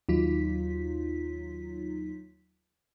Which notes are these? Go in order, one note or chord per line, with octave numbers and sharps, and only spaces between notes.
D#2 F#3 D#4 F4 B6